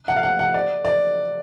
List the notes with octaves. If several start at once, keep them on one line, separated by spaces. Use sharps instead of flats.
F#5
F5
F#5
F#5
D5
D5